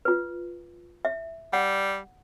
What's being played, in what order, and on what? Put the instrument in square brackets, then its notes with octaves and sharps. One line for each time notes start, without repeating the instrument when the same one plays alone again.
[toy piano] F4 B4
E5
[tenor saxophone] G3 [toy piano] F#5